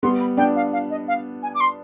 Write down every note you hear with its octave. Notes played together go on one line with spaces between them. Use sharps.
G3 B3 C6
B5
B3 D4 G5
F5
F5
D#5
F5
G#5
D6
C6